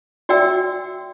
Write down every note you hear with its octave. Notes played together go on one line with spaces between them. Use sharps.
F#4 D5 E5 G5 E6